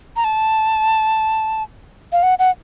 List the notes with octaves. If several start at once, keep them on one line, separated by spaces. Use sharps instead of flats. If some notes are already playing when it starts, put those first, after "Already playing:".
A#5
A5
F5
F#5
F#5